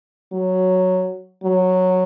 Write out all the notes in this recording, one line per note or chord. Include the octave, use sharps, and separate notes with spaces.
F#3
F#3